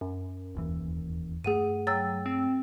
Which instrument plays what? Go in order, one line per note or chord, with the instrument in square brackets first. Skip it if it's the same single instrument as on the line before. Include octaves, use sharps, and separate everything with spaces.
[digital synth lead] F#2
[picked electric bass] E1 D#2 E3
[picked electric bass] G2 A3 [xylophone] G#4 F#5 D#7
[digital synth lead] F#3 [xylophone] G5 E6 A6
[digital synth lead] C4